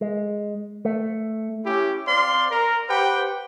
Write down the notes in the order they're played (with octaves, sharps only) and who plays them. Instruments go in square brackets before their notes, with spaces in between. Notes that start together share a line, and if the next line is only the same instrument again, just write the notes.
[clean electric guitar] G#3
A3
[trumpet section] C#4 E4 G4
C4 C5 D5 F5 C6
A#4
G4 B4 C5 F#5 G5